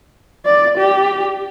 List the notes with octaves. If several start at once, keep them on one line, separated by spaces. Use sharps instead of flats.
D5
G4